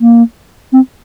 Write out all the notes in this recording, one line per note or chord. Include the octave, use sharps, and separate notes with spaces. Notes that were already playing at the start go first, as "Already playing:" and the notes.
A#3
C4